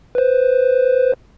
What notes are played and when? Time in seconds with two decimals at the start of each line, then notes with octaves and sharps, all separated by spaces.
0.15 B4 C5